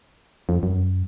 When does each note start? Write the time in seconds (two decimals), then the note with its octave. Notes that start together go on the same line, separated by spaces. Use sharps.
0.49 F2
0.63 F#2